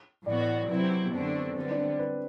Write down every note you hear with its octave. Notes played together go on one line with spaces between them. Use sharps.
A2 E3 B3 F#4 D5
D5
D5
C3 F#3 C4 E4 B4
G4
F#4
B3
F#2 D3 A3 C4 D4
C4
D3 G3 B3 C4
D4
C4
B4